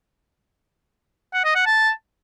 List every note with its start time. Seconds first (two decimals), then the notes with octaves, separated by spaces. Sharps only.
1.34 F#5
1.45 D#5
1.55 F#5
1.66 A5